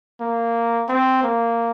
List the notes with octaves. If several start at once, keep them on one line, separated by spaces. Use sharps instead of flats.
A#3
C4
A#3